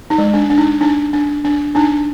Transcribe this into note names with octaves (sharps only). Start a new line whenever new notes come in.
D#4
G#3
D4
D4
D#4
D4 D#4
D4
D4
D4 D#4